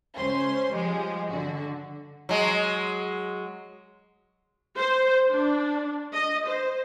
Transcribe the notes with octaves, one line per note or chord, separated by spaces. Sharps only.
C#2 C#4 C5 C6
F3 G3 G#3 G#4
D3 F#4
F#3 G#3
C5
D4
D#5
C5